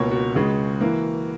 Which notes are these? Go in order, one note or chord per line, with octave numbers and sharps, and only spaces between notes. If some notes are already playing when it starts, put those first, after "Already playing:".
Already playing: C#2 B2 A#3 C#5
F#4
C#2 C#3 G#3
E3 A#3